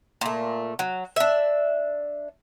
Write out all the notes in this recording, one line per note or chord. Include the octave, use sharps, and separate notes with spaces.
A#2 A3
F#3
D4 E5